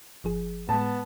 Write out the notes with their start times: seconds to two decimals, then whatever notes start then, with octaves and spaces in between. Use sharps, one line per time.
0.24 G1 F3 G#4
0.69 A2 G#3 B3 A5